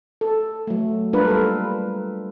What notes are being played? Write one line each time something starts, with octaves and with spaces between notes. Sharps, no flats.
A4
F#3 A3
G3 A#3 D4 F4 A#4 B4
G3 A4